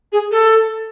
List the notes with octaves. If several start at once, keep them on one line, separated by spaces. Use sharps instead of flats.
G#4
A4